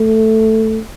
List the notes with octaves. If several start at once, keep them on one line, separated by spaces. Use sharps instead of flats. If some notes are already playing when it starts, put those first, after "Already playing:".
Already playing: A3